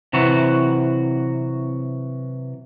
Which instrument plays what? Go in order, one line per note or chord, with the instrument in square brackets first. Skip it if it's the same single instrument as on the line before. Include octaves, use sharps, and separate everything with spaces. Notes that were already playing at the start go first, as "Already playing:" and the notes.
[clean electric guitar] C3 E3 F#3 F#4